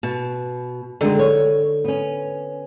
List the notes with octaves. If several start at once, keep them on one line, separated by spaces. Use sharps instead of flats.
B2 A5
F#2 D3 D#3 G#3
C#5
B3 C#4